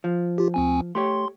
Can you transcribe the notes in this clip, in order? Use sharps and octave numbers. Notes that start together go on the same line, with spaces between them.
F3
F4 G4
D2 C4 G#5
A3 G4 C#5 C6